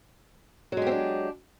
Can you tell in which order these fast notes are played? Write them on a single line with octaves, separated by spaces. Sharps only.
F#3 G#3 G4 C4 D4